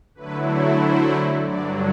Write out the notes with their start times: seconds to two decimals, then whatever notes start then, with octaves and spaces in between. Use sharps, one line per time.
0.15 D3 F#3 A3 E4 B4
0.79 C5
1.42 G2 D3 F#3 D5